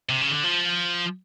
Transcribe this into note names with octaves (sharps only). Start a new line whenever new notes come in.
C3
C#3
D3
F3